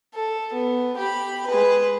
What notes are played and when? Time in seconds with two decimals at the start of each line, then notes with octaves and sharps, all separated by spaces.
0.15 A4
0.53 B3
0.98 G4 B5
1.47 G#3 B4